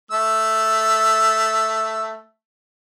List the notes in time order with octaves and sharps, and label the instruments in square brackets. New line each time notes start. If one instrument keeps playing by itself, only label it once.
[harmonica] A3 E6